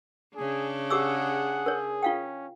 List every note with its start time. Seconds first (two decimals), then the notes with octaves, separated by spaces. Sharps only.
0.36 C#3 D4 G#4
0.90 G4 G#4 F#5 D6 E6
1.66 A#4 C#5
2.03 C#4 F4 F5 G5